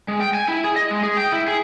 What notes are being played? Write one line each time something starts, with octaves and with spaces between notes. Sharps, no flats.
G#3
G5
G#5
E4
G#4
D#5
G#3
G#4
G5
E4
G#4